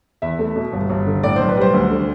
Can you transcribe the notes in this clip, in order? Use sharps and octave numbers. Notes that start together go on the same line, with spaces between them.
E2 E5
A3
B2
G1
G1
D3
A2 D5
B1 C5
B4
G3 C5
D2
D3